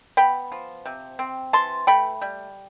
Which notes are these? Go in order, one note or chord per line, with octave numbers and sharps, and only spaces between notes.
B3 G5 B5
F3
C3
C4
E3 A5 C6
A3 G5 B5
G3